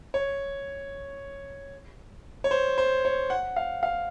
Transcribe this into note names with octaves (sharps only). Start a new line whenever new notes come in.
C#5
C#5
C5
C5
C#5
F#5
F5
F5